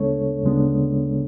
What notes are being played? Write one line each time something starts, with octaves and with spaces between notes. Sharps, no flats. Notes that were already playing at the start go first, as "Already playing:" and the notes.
Already playing: D2 C#3 G#3 B3 D4 A4 C#5
D2 C#3 G#3 B3 D4